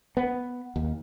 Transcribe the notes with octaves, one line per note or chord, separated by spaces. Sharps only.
B3
D#2